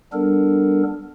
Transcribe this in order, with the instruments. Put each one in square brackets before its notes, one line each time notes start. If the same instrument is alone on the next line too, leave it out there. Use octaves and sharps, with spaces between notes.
[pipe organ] G3 B3 D4 A4 A#4